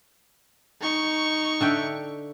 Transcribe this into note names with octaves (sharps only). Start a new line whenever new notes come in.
D#4 C#6
D3 E5 G5